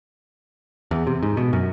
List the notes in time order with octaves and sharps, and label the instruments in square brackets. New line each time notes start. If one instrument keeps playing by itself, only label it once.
[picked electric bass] E2
C3
G#2
B2
F#2